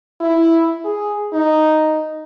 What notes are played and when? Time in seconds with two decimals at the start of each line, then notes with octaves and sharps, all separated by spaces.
0.21 E4
0.85 G#4
1.33 D#4